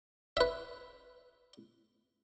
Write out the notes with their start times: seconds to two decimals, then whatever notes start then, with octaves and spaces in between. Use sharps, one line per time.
0.37 B4 E5